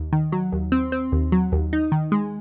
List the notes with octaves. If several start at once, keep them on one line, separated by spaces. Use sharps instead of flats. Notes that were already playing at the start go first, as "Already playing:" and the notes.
Already playing: D#2
D#3
F#3
D#2
C4
C4
D#2
F#3
D#2
D#4
D#3
G#3